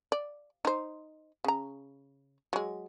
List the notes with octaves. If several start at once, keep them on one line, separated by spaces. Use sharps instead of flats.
D5
D#4 C5
C#3 A#5
F#3 G#3